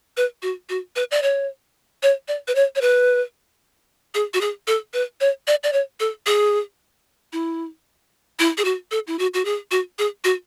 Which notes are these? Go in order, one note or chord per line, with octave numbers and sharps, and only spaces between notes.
B4
F#4
F#4
B4
D5
C#5
C#5
D5
B4
C#5
C#5
B4
G#4
F#4
G#4
A4
B4
C#5
D5
D5
C#5
A4
G#4
E4
E4
G#4
F#4
A4
E4
F#4
F#4
G#4
F#4
G#4
F#4